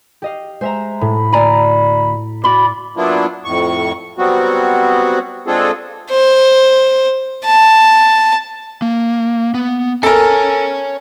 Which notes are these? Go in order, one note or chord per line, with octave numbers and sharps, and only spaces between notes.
G4 D#5 F5
G#3 C5 E5 A#5
A2 B5
D2 D5 G#5 A#5
F#4 D5 E5 B5 F6
F#3 A#3 B3 D4 E4 F4
F2 A2 C#6
F#3 G3 B3 C4 F#4
G#3 C4 D4 F4 G#4 A4
C5
A5
A#3
B3
A4 A#4 C#5 G#5